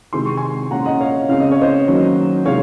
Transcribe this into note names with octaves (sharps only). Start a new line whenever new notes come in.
C3 D#3 G#3 C4 C6
C#6
G#5 C6
A#2 G#3 C#4 F#5 A#5
D#5 F#5
C#5 F5
C#3 G#3 C4 F5
D#5
C#5
C5 D#5
D#3 F#3 A#3 C#4
C3 D#3 G#3 C#5 F5